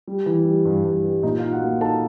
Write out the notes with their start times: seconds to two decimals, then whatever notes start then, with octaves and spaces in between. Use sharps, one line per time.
0.08 G3
0.26 E3
0.45 G3
0.65 G2
0.84 G2
1.04 G3
1.23 A#2 D#4 D#5
1.38 F4 F5
1.43 D#4
1.53 F#4 F#5
1.62 A#3
1.81 D#4 A4 A5